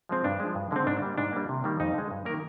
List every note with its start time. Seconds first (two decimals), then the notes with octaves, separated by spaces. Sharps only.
0.09 F3 G#3 C4
0.24 G2 D4
0.40 G#3
0.45 F3
0.55 G2
0.71 D3 G#3 C4
0.87 G#2 D4
1.02 G3 A#3
1.18 G#2 D4
1.33 G3 A#3
1.49 C3
1.64 D#3 G3 A#3
1.80 F2 D#4
1.94 D3 G#3
2.11 G2
2.25 A#3 A#4
2.29 D#3